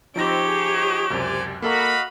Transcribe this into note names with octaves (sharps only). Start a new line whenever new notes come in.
F3 C4 D#4 G4 C#5 A#6 D7
G#4
C#2 F#2 C3 C5 D5 G#5
A#3 F#4 A4 D#5 F5 A#5 B5